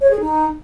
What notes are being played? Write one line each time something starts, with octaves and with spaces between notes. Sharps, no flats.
C#5
G#4
D#4